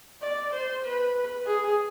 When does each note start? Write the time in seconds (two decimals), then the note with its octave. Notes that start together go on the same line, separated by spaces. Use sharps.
0.22 D5
0.54 C5
0.85 B4
1.47 G#4